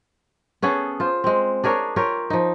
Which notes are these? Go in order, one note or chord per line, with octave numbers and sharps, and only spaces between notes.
B3 C#4 G#4 A4
F4 C5
G#3 C4
D4 G#4 A#4 C#5
F4 G4 A#4 C#5
F3 D#4